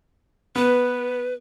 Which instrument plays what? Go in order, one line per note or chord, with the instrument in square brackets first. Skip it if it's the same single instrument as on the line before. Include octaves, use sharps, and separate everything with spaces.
[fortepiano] B3 [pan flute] B4